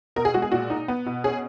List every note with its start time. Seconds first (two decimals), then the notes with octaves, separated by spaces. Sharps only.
0.16 B2 A#4
0.25 G#4
0.34 G#3 F#4
0.42 G#4
0.52 A#2 F#4
0.70 D#4
0.88 B3
1.06 B2
1.24 C#4 G#4